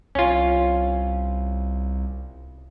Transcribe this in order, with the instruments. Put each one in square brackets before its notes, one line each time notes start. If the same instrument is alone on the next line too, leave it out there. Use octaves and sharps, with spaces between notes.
[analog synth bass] C2 [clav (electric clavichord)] C#4 F4